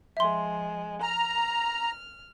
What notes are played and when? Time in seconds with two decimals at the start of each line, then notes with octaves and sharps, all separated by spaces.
0.17 F3 G#3 E5 C6
1.02 A#5 F6